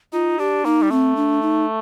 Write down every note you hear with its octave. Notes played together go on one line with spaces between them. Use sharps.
D#4 F4
D4 G4
A#3 D#4
G3
A3 C4
D4
D#4